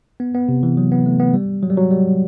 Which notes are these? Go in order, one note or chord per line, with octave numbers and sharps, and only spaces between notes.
B3
B3
C3
E3
F#3
B3
A3
B3
G3
F#3
G3
F#3
G3